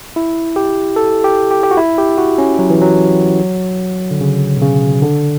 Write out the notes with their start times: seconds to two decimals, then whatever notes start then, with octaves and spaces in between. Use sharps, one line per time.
0.16 E4
0.56 G4
0.96 A4
1.24 G4
1.51 G4
1.63 G4
1.71 F#4
1.77 E4
1.98 G4
2.18 F#4
2.38 C#4
2.59 F#3
2.70 E3
2.82 F#3
4.11 D3
4.21 C#3
4.57 B2
4.61 C#3
5.02 D3